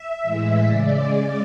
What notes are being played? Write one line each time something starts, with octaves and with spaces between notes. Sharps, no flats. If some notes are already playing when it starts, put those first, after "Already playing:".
Already playing: E5
A2 E3 G#3
C#3 G#3 D5